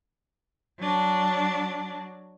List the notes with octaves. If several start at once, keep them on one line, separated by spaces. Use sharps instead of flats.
F#3 D4